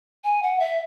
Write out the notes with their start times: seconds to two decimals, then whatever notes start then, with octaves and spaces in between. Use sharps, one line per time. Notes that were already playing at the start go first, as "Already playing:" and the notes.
0.24 G#5
0.43 F#5
0.60 E5